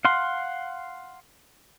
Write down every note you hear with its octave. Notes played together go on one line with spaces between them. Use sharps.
F5 F#5 C6